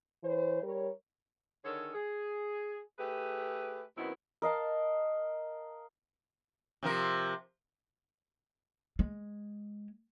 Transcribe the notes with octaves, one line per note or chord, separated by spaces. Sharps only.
E3 C5 C#5
G3 A#4 C#5
D3 D#3 G#4 A4 C#5
G#4
A3 G4 G#4 B4
F#2 B2 D#3 B3 C4 E4
A#4 D#5 F5 A5
C3 F3 A#4
G#3